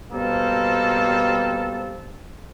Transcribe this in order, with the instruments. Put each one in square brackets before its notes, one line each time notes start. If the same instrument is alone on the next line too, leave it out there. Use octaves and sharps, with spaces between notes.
[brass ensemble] B2 G3 A#3 C4 A4